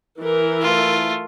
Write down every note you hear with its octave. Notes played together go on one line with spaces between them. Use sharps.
E3 A#4
A3 F4